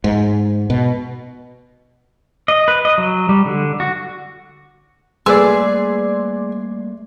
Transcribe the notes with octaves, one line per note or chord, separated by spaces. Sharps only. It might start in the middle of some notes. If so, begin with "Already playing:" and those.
G#2
B2
D#5
B4
D#5
F#3
G3
D3
F#4
G3 A3 A#3 G#4 B4 D5 C6 E6